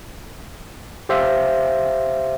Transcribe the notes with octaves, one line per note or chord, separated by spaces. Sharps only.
G4 C5 E5 F5